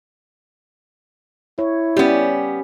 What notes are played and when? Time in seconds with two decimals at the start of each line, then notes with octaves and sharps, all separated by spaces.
1.59 E4 C#5
1.97 G3 B3 C#4 G4